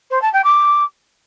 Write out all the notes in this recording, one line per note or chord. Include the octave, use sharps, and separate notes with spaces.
C5
A5
G5
D6